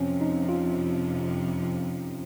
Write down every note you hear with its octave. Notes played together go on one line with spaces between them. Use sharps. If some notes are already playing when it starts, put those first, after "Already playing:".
Already playing: F2 C3 F3 C4 C#4
D#4
F4